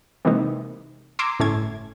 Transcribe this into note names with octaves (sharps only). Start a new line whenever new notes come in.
C3 E3 G#3 A#3 D#4
A#5 C6 D6 E6 G#6
G1 A2 A3 C#4 G#6